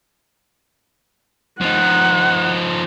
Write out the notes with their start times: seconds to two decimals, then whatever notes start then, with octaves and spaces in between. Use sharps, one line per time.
1.61 F3 D#4 F#5